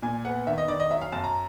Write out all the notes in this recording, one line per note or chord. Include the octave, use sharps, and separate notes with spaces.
A#2 G#5
B3 F#5
D#3 E5
D#5
D#3 D5
D#5
F#3 E5
F5
F#2 A5
A#5